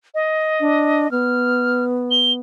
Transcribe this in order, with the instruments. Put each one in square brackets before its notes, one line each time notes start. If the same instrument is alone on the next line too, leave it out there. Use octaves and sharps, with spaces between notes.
[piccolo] D#5
[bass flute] D4
[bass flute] B3 [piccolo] F6
[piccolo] G7